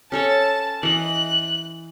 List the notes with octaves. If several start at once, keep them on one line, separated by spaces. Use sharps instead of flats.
C#4 A4 C#5 A5
E3 D#5 F#6